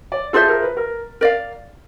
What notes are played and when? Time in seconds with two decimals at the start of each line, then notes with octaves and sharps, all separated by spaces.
0.12 D5
0.33 F4 G#4 A4 C5 E5
0.49 A#4
0.62 B4
0.77 A#4
1.21 A#4 D5 F5